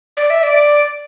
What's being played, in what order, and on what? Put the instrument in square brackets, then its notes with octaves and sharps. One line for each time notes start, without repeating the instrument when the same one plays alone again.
[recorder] D5
E5
D5